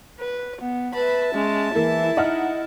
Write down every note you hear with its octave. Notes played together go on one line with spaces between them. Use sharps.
B4
B3
B4 E5 A5 B5
G#3 C#4
E3 A#3 E4
D#4 D#5 F#5 F6